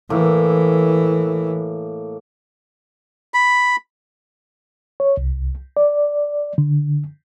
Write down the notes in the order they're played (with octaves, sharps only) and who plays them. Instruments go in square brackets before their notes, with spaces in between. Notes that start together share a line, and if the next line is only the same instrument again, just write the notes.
[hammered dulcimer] A2 A#3 [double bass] E3
[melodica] B5
[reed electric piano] C#5
C2
D5
D3